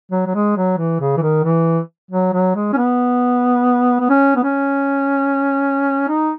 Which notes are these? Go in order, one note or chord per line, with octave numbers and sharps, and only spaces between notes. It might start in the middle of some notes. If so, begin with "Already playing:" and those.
F#3
F#3
G#3
F#3
E3
C#3
E3
D#3
E3
F#3
F#3
G#3
C#4
B3
B3
C#4
B3
C#4
D#4